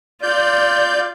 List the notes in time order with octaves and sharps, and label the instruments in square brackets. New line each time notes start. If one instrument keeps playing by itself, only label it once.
[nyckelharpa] F4 [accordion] D5 G6